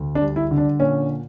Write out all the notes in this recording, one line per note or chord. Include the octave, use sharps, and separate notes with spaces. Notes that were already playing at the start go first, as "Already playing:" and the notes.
Already playing: D2
D4
G3
E4
D3
D4
A#2 C#4